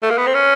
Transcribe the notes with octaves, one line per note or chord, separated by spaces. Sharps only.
A3
A#3
B3
C4
C#4